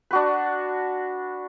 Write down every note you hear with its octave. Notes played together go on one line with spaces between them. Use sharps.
D4 F#4 B4